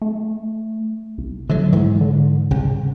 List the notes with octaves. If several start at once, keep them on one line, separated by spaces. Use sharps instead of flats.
A3
C2
D3 F3 F#3 A3
G#2 E3
D3
C2 C#3